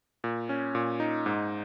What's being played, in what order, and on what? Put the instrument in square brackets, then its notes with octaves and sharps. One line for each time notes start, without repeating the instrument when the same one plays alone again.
[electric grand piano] A#2
C#4
A#2
D#4
G#2